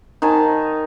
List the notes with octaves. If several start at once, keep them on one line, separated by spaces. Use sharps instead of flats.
D#3 D#4 G#5 A5